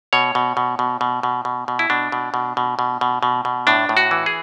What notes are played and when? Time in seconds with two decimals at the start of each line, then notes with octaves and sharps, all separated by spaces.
0.13 B2 C#5
0.35 B2
0.57 B2
0.79 B2
1.01 B2
1.23 B2
1.45 B2
1.68 B2
1.79 E4
1.90 B2 D4
2.12 B2
2.34 B2
2.57 B2
2.79 B2
3.01 B2
3.23 B2
3.45 B2
3.67 A2 D4
3.89 A2
3.97 F#4
4.11 E3
4.26 G#4